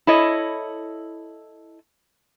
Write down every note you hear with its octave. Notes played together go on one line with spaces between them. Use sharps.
E4 A4 C#5 D#5